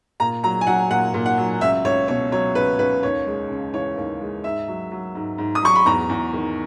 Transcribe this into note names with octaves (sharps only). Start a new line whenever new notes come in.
A#2 A#5
F#3 A#5
G#5
F#3 F#5
A#2 F#5
A#2
F#5
F#3
C#2 E5
C#2 C#5
B2 C#5
F#3 C#5
C#2 B4
C#2 B4
D#2 C#5
G#3
C#3
E3 C#5
D#2
G#3
G#2 E5
F#3
F#3
G#2
G#2
D#6
F#3 C#6
B5
E2 A#5
E2
D#3